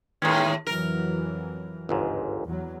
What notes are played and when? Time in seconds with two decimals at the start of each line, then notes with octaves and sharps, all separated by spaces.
0.22 D#2 A2 D#3 G#3 C#4
0.67 F2 E3 F#3 A#4 A#5
1.89 G1 C#2 G#2
2.46 E2 F#3